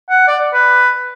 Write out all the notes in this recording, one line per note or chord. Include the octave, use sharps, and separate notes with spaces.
F#5
D5
B4